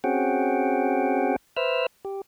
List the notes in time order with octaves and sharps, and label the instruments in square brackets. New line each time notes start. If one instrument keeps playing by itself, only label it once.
[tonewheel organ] C4 C#4 F#4 G#4 F#5 G5
B4 C5 E5 E6 F6
G4